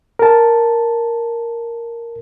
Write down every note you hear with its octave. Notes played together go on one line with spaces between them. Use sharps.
A#4 A5